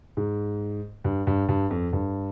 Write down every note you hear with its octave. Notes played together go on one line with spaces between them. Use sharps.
G#2
G2
G2
G2
F2
G2